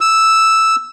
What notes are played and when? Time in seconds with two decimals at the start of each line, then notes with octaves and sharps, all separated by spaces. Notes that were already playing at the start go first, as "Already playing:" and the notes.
0.01 E6